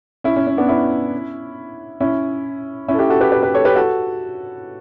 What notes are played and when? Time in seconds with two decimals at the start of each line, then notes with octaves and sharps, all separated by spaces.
0.24 C#4 E4
0.36 C#4
0.47 C#4
0.57 B3 D4
0.69 C#4 E4
2.00 C#4 E4
2.88 C#4 E4
2.94 A4
2.99 E4 G4
3.10 F#4 A4
3.21 G4 B4
3.32 G4 B4
3.43 G4 B4
3.54 A4 C#5
3.65 G4 B4
3.76 F#4 A4